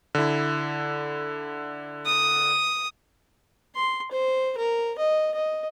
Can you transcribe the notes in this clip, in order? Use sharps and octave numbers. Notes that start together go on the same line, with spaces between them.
D3 E4
D#6
C6
C5
A#4
D#5
D#5